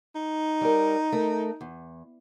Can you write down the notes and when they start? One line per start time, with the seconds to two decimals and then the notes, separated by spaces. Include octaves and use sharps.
0.15 D#4
0.61 G3 A#4
1.12 A3 A#4
1.61 E2